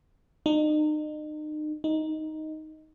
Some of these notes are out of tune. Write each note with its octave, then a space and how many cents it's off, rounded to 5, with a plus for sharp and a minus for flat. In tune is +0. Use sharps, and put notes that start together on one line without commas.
D#4 -35
D#4 +5